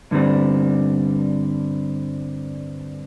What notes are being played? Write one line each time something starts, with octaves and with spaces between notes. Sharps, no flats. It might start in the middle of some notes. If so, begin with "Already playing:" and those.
G2 D3 G3 C4